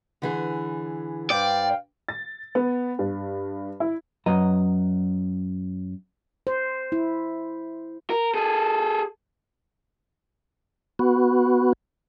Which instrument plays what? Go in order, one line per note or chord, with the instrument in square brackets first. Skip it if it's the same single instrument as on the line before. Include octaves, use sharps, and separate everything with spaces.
[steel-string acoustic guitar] D3 E3 G#4
[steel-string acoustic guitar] G2 C5 [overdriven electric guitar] D5 [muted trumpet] F5 [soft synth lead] G5
[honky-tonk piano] A6
B3
G2
E4
[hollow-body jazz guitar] F#2 F#3 B4 D#5 A#5
[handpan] C5
E4
[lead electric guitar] A#4
G#4 A4
[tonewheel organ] B3 F#4